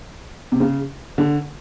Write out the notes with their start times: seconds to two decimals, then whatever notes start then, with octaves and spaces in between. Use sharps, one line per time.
0.52 C3
0.60 C#3
1.18 D3